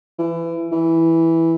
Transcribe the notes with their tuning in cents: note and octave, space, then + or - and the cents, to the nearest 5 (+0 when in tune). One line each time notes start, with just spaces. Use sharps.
E3 +25
E3 -5